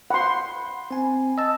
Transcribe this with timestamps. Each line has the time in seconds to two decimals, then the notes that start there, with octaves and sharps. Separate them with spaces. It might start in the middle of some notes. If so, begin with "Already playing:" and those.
0.10 F#5 B5 C6
0.91 C4 G#5
1.38 D#5 A5 E6